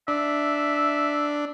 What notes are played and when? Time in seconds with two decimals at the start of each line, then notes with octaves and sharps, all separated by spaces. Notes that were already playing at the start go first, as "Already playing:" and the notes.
0.08 D4 E5